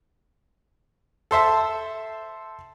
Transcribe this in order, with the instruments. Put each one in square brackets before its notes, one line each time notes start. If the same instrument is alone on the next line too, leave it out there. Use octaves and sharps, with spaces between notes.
[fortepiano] A4 C5 E5 A5